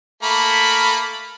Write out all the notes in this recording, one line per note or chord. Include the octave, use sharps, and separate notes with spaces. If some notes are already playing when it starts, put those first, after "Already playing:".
A3 A#3 B5